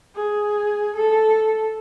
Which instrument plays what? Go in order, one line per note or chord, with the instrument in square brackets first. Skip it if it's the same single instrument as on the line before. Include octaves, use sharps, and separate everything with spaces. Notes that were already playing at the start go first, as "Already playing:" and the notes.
[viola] G#4
A4